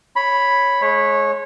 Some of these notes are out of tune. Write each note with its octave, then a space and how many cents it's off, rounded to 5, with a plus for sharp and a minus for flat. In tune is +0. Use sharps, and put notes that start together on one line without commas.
C#5 +0 B5 +0
G#3 +30 C#5 -20